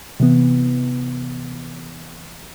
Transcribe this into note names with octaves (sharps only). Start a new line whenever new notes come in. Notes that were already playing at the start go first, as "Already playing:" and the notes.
C3 E3 B3